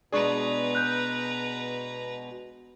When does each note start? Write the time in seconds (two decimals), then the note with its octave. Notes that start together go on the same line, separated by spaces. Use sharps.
0.12 B2 G#3 D4 G#4 B4 D5 A#5 C#6
0.75 F#6 G6